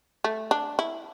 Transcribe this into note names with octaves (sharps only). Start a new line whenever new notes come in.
A3
D4
E4